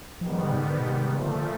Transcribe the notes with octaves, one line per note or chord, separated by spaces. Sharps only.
G#2 D#3 F3 G3 B3
F3
D3
C3
C#3
D3
B2
C3
A#2 C#3 F3 A3
D3
D3